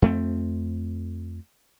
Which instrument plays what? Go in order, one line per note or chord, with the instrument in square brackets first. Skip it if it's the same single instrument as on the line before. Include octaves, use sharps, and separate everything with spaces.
[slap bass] F2 A3 C4